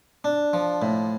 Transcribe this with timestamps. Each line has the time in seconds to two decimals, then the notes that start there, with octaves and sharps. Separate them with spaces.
0.24 D4
0.53 F3
0.82 A2